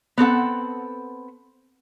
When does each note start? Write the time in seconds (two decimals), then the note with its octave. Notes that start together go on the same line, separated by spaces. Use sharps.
0.18 B3 C4 A4 F#5